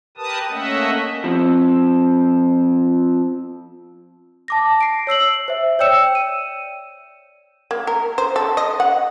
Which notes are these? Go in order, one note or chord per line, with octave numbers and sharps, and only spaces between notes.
G4 A#4 B4 A5 D#6
A3 A#3 C#4 D#5 E5 F#5
F3 C4
A5 D6 A#6
C7 D7
C#5 E6 C7 F#7
C5 E5
C#5 D5 G5 E6 C#7 E7
D#7
A#3
A#4
C5
A4
D#5
F#5